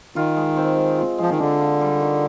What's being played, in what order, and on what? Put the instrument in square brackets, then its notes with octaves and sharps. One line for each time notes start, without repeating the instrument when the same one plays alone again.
[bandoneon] D#3 [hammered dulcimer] F4
[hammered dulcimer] G#3
C4
G#3
F4
[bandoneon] F3 [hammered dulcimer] G#3
[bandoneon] D#3
[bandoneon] D3 [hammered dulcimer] D4
[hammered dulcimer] F4
G3
D#3